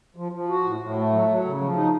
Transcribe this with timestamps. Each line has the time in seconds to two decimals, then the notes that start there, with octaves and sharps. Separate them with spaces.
0.16 F3
0.32 F3
0.49 F#4
0.64 A2
0.80 A2
0.96 A3
1.12 F#3
1.28 F#3
1.44 C#3
1.61 F3
1.76 D#4